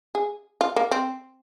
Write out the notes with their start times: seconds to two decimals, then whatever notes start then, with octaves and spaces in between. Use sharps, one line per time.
0.15 G#4
0.61 F4
0.76 A#3
0.91 C4